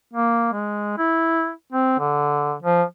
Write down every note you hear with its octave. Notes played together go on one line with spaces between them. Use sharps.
A#3
G#3
E4
C4
D3
F3